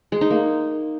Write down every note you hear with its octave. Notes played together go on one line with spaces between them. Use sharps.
G#3
D#4
A#3